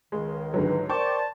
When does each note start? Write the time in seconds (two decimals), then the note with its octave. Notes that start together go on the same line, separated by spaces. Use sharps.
0.12 C#2 D#3 G#3
0.54 G#2 D3 E3 F#3 B4
0.90 A#4 C5 D5 G5 A5 C#6 D6